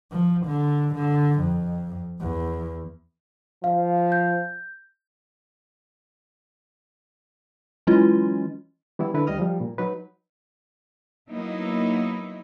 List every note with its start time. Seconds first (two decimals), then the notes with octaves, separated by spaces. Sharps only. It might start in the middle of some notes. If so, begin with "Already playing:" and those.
0.11 F3
0.47 D3
0.95 D3
1.40 F2
2.20 E2
3.64 F3 F5
4.12 G6
7.87 E3 F#3 G#3 C#4 E4 F4
8.99 E3 G3 B3 E4
9.14 D3 E4 B4
9.27 D2 G3 D#5 D#6 F6
9.39 F3 G3
9.61 A#2
9.78 F#3 D#4 B4
11.29 F#3 A#3 B3 D#4 E4